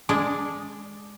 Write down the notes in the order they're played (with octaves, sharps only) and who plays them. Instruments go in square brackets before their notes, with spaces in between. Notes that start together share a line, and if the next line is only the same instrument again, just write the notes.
[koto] G#3 D4